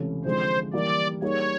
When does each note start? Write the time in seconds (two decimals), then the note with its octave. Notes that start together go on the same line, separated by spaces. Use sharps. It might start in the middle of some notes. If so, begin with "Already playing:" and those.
Already playing: C#2 C3 E3 A3 C#4
0.25 D3 F3 G#3 C4 C5
0.73 E3 G3 A#3 D5
1.22 G3 A#3 D#4 G#4 C#5